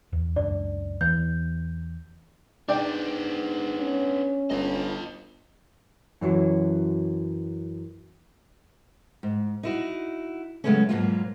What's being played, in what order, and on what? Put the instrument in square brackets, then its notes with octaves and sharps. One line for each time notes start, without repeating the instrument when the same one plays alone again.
[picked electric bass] E2
[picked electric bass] C#2 F#2 D4 [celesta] D5
[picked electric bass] E2 E3 B3 [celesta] G6
[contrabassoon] G#2 [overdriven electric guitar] B3 D4 [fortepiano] D5 G5
[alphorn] C#4
[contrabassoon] G1 [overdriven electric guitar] F4 D#5
[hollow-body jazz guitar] F#2 E3 F#3
[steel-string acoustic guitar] G#2
D#4 E4 F#4
C#3 F#3 G#3 A3 B3 C#4
G#2 B2 F#3 A#3 B3 F4